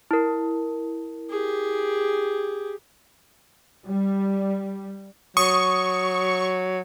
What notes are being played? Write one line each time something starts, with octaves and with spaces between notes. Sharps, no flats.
E4 A#4
G4 G#4
G3
F#3 C#6 D#6